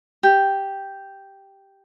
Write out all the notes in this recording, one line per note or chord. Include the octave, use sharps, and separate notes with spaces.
G4